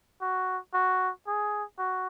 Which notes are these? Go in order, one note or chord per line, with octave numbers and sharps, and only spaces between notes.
F#4
F#4
G#4
F#4